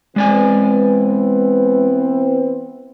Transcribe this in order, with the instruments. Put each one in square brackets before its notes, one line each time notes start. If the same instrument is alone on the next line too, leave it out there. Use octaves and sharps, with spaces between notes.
[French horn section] E3 B3 C4 [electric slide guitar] G#3 D5 G#5